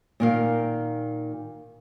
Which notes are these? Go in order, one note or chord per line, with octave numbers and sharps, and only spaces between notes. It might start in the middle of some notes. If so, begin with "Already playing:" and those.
A#2 D#3 F5